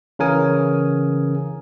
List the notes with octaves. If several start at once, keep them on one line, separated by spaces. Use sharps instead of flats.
C#3 E3 C#4 A#4 G#5 D#6